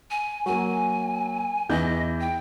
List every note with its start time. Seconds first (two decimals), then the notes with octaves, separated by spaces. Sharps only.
0.11 G#5
0.46 F#3 A#3 G#5
1.69 E2 E3 D#5 G6
2.20 G5